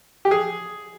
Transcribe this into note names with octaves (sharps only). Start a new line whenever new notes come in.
G4
G#4